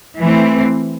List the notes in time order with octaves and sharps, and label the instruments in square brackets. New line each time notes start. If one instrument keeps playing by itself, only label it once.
[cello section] E3 A3 C4